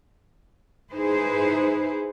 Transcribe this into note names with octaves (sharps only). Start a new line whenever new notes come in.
D#4 E4 G#4 B4 C5